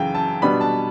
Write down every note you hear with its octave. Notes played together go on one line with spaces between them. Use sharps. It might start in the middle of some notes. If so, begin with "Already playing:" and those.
Already playing: F#2 C#3 E3 F5 G5
A5
B2 G3 B3 D4 B5
A5